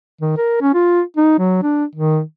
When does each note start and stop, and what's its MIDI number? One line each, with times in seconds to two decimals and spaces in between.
0.21 0.32 51
0.37 0.58 70
0.61 0.72 61
0.74 1.01 65
1.17 1.39 63
1.39 1.60 54
1.63 1.85 62
1.95 2.21 51